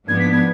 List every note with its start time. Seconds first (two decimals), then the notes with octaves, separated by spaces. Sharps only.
0.08 G#2 F3 B3 D4 G#6
0.20 B6
0.32 G#6